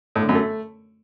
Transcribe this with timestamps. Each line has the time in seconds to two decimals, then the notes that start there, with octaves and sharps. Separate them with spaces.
0.16 A2
0.22 D3
0.29 F#2
0.35 A3